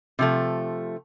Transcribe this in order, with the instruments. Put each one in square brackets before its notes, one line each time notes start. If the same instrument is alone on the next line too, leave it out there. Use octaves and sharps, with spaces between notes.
[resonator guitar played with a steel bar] C3 F3 A3